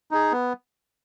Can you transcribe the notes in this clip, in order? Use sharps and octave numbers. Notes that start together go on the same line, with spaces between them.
D#4 G#4
B3